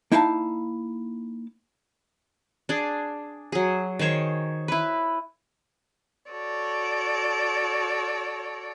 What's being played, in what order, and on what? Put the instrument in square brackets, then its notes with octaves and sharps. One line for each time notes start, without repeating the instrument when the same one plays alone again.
[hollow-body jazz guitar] A#3 D#4 E4 F5 F#5 A5
[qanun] D4 G#4
F#3 G#4
D#3 G#4 C5 C#5
E4 B4
[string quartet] F#4 A4 C#5 D5